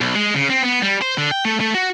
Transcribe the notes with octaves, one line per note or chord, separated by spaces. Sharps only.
B1
G#3
C#3
C4
B3
G3
C5
D3
G5
A3
A3
F#4